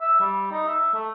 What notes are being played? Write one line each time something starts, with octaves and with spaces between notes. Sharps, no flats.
E5
G3
D#4
E5
A3